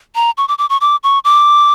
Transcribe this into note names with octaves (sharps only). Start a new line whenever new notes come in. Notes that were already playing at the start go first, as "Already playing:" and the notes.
A#5
C#6
D6
D6
C#6
D6
C#6
D6